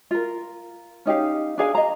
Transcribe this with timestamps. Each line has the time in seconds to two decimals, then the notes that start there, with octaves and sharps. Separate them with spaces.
0.11 F4 A#4
1.06 C#4 D#4 G4 F5
1.58 D4 G#4 F5 G#5
1.75 D#5 A#5